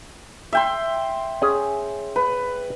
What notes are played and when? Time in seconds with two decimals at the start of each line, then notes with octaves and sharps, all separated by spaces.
0.53 E5 G5 C6
1.42 C#4 G#4
2.16 B4